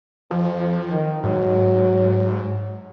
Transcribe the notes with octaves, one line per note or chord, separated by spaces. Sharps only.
F2 F3
D#3
G#2 F#3